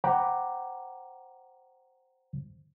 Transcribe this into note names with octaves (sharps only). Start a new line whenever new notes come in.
C5 F#5 G5 A#5 B5 D6